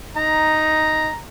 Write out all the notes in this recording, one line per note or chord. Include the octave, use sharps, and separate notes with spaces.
D#4 A#5